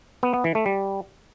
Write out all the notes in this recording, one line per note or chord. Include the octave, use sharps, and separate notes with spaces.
B3
B3
E3
A3
G3